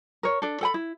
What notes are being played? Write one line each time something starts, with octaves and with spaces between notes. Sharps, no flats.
A#4 C#5
D4 A4
A4 G5 B5
E4